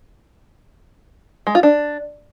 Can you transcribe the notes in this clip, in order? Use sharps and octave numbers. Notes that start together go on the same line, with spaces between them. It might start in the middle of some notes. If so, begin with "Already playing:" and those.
G#3
F4
D4